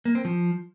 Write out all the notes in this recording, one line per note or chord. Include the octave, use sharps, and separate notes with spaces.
A#3
C4
F3